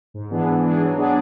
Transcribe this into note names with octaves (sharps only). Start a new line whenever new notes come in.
G#2
E3 B3 D4 G#4
G#2
E3 B3 D4 G#4
F#3
B3 D4 G#4 D5